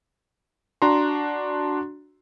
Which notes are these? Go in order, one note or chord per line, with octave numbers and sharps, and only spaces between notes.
D4 F#4 A#5 C6